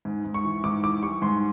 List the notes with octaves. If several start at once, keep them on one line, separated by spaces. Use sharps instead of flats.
G#2
G#2
C#6
E3
G#2 D6
E3 D6
G3 C#6
G#2 C6